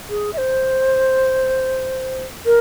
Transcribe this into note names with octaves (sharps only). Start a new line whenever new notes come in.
G#4
E5
C5
A#4